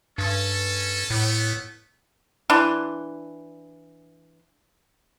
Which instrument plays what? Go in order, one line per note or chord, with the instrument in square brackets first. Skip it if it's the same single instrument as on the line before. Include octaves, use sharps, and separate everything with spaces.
[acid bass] G2 [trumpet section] C#4 A4
[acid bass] A2 [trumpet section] A3 B3
[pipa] E3 D4 C6